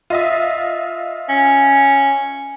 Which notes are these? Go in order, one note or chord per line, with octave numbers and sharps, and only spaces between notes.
F4 D#5 E5
C#4